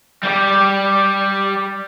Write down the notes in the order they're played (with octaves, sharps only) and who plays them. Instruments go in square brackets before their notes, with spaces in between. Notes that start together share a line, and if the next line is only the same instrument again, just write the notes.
[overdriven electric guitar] G3 G4